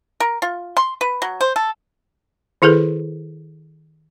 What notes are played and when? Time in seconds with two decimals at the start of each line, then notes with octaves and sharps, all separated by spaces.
0.20 A#4
0.42 F4
0.77 C6
1.01 B4
1.22 F#3
1.41 C5
1.56 A4
2.62 D#3 E4 G#4 A4 B4